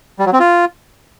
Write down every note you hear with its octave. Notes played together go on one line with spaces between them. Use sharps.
G3
F#3
C4
F4